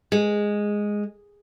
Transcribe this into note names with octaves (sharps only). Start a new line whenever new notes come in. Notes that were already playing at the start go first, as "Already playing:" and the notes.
G#3